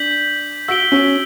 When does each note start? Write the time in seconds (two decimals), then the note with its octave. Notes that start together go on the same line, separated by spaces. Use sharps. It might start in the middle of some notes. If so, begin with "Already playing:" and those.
Already playing: D4 G6 B6 F#7
0.68 F#4 E6 B6 D7 G7
0.92 C#4